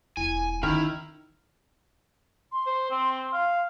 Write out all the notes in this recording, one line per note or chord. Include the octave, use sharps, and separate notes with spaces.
E1 E4 G#5
D#3 C#4 E4 A#5 F6 F7
C6
C5
C4
F5